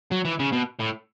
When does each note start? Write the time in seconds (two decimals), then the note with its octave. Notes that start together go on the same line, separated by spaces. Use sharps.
0.11 F#3
0.25 E3
0.39 C#3
0.52 B2
0.79 A2